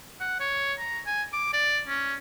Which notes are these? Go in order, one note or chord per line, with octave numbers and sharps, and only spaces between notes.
F#5
C#5
A#5
G#5
D6
D5
C#4